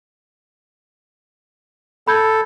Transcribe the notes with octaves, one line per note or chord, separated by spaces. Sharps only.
A4 B5 G6 G#6